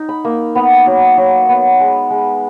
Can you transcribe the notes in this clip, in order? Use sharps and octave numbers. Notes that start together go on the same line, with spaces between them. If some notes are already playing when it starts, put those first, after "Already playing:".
Already playing: D#4
B5
A#3
B3 A#5
F#3
F#3
B3
G#3
G#3